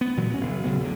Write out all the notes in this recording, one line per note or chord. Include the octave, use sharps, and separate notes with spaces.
B3
A#2 E3 F#3 G#3
D2 A3 C#4
F#1
A#1 C#3 F#3 B3
E2 A2 D3